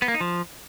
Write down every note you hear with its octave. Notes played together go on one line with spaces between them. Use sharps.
B3
A#3
D#4
F3